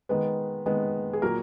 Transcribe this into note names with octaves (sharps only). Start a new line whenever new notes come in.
D#3 G#3 B3 B4
D#3 G#3 B3
G#4
A#2 F#3 A#3 A#4